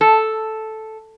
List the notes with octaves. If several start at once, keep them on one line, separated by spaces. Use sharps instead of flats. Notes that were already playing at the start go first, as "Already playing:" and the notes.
A4